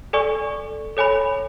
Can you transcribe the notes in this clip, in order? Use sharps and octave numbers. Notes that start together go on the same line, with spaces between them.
A4 D5 G#5 C#6
A4 C#5 G#5 B5